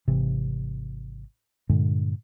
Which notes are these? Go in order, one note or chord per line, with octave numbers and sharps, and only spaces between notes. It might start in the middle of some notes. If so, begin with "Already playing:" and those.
G#1 C3 E3
G2 A#2 D3 G#3